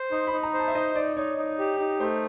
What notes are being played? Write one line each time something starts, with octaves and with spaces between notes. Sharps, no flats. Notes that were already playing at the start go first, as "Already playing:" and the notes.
Already playing: C5
D#4 C6
B5
D#4
A#5
C5
A5
E5
D#4 D#5
D#4 D5
D#4 C#5
D#4
G4
D#4
A3 C5